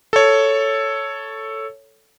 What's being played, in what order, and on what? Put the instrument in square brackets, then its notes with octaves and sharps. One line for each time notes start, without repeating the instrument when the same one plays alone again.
[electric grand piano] A4 C#5